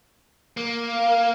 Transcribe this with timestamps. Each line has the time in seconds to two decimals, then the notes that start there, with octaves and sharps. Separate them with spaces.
0.57 A#3
0.89 F5